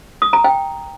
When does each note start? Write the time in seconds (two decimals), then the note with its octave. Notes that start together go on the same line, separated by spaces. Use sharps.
0.22 D#6
0.33 A#5
0.44 G5